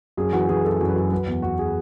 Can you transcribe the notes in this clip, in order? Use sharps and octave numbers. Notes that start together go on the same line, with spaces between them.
F#2 G#4
E3 F#4
E3 G#4
F#2 A4
F#2
B4
F#2
F#3 B4
E2
E2 F#4
G#4